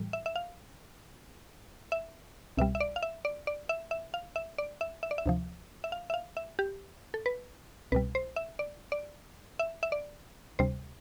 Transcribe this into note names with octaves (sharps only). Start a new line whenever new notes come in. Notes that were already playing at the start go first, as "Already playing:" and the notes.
Already playing: A2 E3 G3
E5
E5
F5
E5
C2 B2 G3 E5
E5
D5
F5
E5
D5
D5
E5
E5
F5
E5
D5
E5
E5
D5
E5
D2 C3 F3
E5
F5
E5
F5
E5
G4
A4
B4
C2 B2 G3 B4
C5
E5
D5
D5
E5
E5
D5
D2 C3 G3 C5